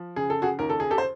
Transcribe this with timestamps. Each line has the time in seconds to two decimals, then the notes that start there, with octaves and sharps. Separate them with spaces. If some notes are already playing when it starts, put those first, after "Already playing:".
Already playing: F3
0.16 C#3 G#4
0.30 A4
0.42 F#4 G#4
0.59 D#2 A#4
0.70 A4
0.80 G#4
0.90 G4 A4
0.98 C5